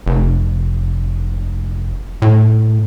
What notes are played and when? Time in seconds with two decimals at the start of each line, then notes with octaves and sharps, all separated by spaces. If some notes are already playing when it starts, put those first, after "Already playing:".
0.06 F1
2.22 A2